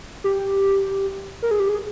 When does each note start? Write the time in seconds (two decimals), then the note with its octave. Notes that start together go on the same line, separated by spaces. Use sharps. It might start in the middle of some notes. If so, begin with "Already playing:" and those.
0.24 G4
1.42 A#4
1.51 G#4
1.60 G4
1.69 G#4